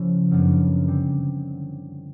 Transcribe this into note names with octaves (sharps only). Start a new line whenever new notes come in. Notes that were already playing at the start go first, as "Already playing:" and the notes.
Already playing: C#3 F3 A#3 C#4 E4
F#2 C#3 F#3 B3 D4
D3 G3 C4